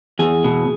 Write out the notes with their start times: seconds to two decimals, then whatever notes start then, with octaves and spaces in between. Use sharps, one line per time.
0.19 E2 G#4
0.44 B2